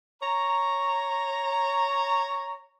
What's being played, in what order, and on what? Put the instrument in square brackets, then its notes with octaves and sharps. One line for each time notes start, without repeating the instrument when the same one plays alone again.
[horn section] C#5 A#5